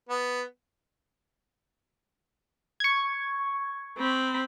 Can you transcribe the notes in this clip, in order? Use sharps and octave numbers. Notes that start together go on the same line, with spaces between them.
B3
C#6 G#6
C4 B5